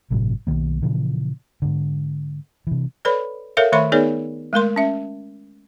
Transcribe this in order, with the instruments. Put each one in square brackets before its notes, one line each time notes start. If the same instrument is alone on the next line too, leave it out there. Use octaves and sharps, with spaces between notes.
[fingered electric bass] G1 A2 C3 F#3
B1 F2 D#3 A#3
A#2 C#3 E3 F3
G#2 D3
C3 E3
[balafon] A4 B4 C#5 D5 B5
A4 A#4 C#5 E5 F5
D#3 A3 C#5 E5 B5 C6
B3 D#4 G#4 A#4 C#5 D5
G#3 A3 A#4 C6
C#4 E5